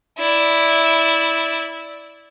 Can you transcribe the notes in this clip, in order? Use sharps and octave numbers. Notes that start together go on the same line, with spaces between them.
E4 D5